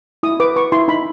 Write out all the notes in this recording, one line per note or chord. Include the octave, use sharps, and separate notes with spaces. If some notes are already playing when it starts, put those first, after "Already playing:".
E4 D#6
B4 D6
B4 C#6
E4 C6
D#4 B5